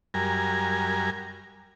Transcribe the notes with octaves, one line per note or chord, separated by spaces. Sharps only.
F#2 G3 A#4 G#5